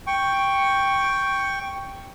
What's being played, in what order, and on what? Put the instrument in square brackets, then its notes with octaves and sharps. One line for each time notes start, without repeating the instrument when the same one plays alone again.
[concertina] G5 C#6